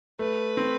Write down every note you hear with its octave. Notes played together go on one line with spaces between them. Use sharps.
A3 B4
C4